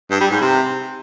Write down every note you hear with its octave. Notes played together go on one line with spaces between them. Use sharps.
G2
G3
G#2
C3